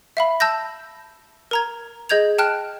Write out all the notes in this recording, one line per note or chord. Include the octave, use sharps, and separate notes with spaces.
E5 F5 B5
A5 E6 G6 A#6
A#4 A#5 G#6
G#4 D#5 G6 G#6 F7
G5 A5 F6 F#6 D7